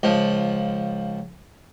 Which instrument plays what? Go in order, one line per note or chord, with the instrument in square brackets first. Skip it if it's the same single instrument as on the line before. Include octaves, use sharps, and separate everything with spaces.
[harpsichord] C#2 F3